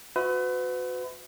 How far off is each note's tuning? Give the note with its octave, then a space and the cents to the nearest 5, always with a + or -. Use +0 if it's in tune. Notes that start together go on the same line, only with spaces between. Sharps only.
F#4 -20 B4 +35 E5 -40